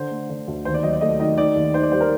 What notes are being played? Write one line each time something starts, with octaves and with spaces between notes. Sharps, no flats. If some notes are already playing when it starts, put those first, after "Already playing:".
Already playing: D3 C5
A3
D3
D2
D#2 C5
D5
F#3 D#5
D5
A3 D#5
D#3 D#5
D#3 D5
D#2
D#3 C5
D5
G3 C5
A#4